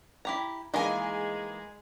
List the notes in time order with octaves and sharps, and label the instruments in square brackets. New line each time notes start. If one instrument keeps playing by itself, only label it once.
[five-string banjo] E4 G4 A#5
[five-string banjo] D#3 E3 A#3 [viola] G#3 G#4 [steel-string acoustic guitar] D#5 G#5